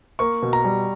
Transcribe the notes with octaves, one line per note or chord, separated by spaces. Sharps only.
A#3 C#6
B2
A#5
G3